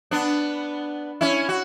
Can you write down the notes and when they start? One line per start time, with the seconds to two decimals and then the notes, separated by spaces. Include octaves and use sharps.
0.11 B3 D4
1.21 C#4 E4
1.49 F#4